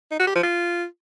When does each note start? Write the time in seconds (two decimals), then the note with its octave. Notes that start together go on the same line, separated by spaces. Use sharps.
0.11 D#4
0.19 F#4
0.27 G4
0.35 F3
0.43 F4